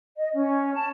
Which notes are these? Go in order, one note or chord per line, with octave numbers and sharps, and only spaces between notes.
D#5
C#4
A5